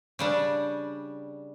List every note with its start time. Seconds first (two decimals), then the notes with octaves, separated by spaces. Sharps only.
0.19 C#3 G3 D4